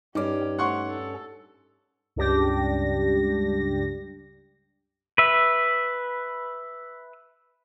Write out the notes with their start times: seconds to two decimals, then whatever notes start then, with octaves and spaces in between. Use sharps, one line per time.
0.15 G2 C#4 D#4 G4 D6
0.59 A3 F#5 C6 C#6
0.89 A4
2.16 C#2 G2 D4 G4 A#6
5.18 B4 E5